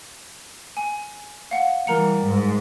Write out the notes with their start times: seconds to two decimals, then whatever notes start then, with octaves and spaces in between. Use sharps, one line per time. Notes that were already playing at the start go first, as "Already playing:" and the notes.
0.77 G#5
1.51 F5 F#5
1.87 E3 G3 A#4 A#5 C#7
2.25 G#2